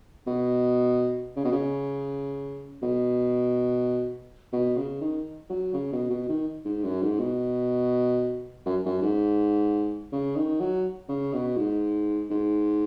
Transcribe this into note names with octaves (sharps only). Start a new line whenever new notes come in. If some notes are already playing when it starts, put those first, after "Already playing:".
B2
C#3
B2
C#3
B2
B2
C#3
D#3
F#3
C#3
B2
B2
D#3
G#2
F#2
G#2
B2
F#2
F#2
G#2
C#3
D#3
F#3
C#3
B2
G#2
G#2